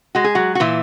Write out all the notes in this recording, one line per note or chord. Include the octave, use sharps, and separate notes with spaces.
G#3 F#4
G#4
F#3 F#4
F#4
A#2 E3 E4